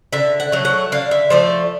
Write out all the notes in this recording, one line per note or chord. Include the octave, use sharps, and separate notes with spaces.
D3 E5
F#5
F#3 A3
F#5
D3 F5
E5
F3 A3 D5